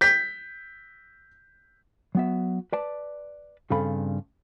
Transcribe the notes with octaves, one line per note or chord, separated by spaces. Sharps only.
G6 B6
F#3 B3 E5
B4 D5 A5
G2 C#3 C4 A4 F5 B5